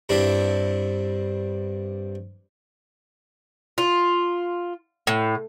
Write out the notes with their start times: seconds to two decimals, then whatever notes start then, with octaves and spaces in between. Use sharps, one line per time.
0.09 G2 C3 D4 E4
3.78 F4
5.07 A2